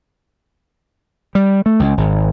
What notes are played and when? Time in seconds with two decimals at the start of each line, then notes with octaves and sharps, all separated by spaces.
1.35 G3
1.66 A3
1.80 C#2
1.97 G#1